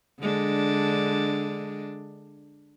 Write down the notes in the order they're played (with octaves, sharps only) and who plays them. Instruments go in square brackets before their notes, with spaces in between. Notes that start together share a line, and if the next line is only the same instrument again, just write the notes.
[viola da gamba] D3 G#3 D4